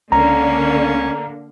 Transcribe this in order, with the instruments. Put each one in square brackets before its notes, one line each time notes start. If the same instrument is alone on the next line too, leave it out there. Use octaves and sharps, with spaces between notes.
[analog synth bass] C#2 [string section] D3 A#3 [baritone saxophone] C#4 [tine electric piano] A#5